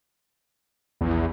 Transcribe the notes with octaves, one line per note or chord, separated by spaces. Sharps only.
A#1 E2